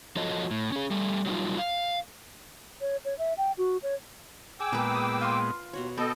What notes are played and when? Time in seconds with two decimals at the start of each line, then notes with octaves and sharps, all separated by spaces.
0.16 F3 F4 F#4 A4 C#5 D#5
0.51 A2
0.72 C#4 G#4
0.91 G3 A3
1.26 F#3 G3 D#4 F4
1.58 F5
2.81 C#5
3.05 C#5
3.19 E5
3.38 G5
3.58 F#4
3.83 C#5
4.60 G#4 G5 D6 E6
4.73 A#2 G#3 B3 A#4 B4
4.95 D#6
5.21 F4 C6
5.73 D#2 B2 F#4 C#5
5.97 B3 A4 D#5 G5 A5